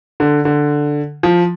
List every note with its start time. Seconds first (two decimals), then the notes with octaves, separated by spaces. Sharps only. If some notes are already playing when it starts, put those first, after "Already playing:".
0.20 D3
0.45 D3
1.23 F3